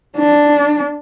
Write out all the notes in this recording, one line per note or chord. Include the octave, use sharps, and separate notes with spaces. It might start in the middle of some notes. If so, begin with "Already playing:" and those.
D4